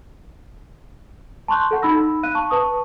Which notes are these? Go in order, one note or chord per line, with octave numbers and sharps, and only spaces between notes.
A5 C6 C#6 F#6 G6
A4 F#5
D#4 B5 E6 A#6
F5 F#6 D#7
A5 C#6
B4 A5 C#6 D#6